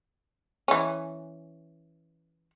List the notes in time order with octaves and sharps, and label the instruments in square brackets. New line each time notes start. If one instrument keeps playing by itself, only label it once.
[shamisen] E3 C#4